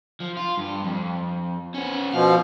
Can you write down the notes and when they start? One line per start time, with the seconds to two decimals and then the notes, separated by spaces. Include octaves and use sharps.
0.20 F3
0.37 F4
0.57 G2
0.84 F2
1.74 B3 C#4
2.13 B2 F3 F5